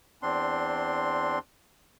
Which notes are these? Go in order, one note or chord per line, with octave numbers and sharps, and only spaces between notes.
E2 C4 D4 C6